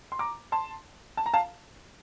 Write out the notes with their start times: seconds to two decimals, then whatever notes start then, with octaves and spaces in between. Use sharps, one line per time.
0.12 C6
0.19 A#5 D6
0.52 A5 C6
1.17 A5
1.26 A#5
1.34 F5 A5